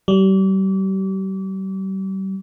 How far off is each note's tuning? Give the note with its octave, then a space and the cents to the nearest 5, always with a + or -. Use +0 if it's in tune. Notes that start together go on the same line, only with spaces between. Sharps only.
G3 -35